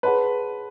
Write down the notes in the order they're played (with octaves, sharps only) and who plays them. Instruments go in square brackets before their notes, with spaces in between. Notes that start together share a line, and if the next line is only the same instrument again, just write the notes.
[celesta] G#4 C#5 F#5 A5 C6 [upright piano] B4